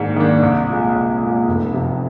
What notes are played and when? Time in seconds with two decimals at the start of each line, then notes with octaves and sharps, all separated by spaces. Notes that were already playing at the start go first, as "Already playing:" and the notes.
Already playing: G#2 D#3 A#3 D4
0.16 D#3 A#3 D4
0.43 C2
0.69 A#2 G#3
0.96 C2
1.21 A#2 G#3
1.48 F1
1.74 F2 C3